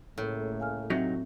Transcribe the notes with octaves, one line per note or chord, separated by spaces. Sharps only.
A2 C#3 A3 A#3
F5 G#5 F6
C3 F#3 C4 D#4 E5